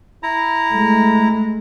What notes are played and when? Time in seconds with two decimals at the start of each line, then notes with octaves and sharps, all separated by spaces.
0.23 E4 A#5
0.72 G#3 A3